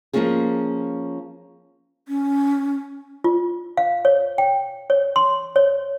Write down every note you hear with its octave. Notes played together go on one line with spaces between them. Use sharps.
F3 F#3 A#3 C#4 F4 G#4
C#4
F4
F5
C#5
G5
C#5
C6
C#5